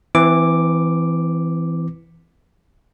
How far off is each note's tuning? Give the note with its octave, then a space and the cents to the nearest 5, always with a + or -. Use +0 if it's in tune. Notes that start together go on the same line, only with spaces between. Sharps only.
E3 +0 C4 -35 D6 +0